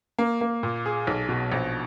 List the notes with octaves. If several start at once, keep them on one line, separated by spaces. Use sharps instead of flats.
A#3
A#3
A#2
G#4
B1
B2
A#1